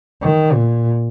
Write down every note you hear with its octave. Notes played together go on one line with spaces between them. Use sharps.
D#3
A#2